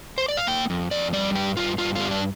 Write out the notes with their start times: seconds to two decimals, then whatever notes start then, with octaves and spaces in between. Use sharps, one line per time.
0.18 C5
0.28 D5
0.37 F5
0.47 A#3 G5
0.70 F2
0.91 F2 D5
1.13 G3 D5
1.35 G2 G4
1.57 G2 F4
1.78 G2 F4
1.95 G3 F4
2.11 D4